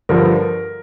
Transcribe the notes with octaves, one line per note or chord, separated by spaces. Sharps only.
G2 D3 F3 A#4